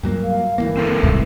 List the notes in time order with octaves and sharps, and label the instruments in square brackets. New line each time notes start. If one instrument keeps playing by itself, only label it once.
[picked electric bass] G2 F#3 A#3 [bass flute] F3
[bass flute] F5
[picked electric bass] G1 E2 A#3 [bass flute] E3
[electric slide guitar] C4 A4 B4
[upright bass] D1 G#2 [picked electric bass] C2 [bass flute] E5